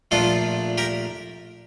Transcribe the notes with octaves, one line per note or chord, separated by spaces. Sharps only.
A#1 A#2 A3 D4 F4 A4
G4 A#4